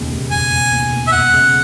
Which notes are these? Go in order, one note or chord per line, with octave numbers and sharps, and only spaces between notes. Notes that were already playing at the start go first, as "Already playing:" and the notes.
Already playing: E1 D#2 C#3
D#2
E1 G#5
E1
D#2
D#2
E5
E1 F#5
C#3